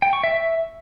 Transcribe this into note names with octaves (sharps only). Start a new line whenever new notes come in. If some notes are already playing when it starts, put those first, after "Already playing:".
G5
C#6
E5
E5